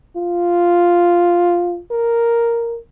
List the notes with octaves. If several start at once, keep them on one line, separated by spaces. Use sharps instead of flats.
F4
A#4